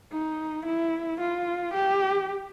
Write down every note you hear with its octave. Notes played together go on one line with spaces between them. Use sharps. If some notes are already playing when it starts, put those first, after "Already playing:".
D#4
E4
F4
G4